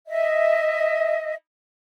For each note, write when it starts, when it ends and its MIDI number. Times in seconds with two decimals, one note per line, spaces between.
0.08 1.33 75
0.08 1.33 76